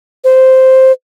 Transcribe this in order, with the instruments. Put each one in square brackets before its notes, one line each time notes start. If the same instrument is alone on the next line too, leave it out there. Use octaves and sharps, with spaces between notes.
[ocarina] C5